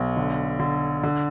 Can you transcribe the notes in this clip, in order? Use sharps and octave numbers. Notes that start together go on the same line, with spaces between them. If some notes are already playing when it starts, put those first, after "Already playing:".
Already playing: B1
D3
D3
D3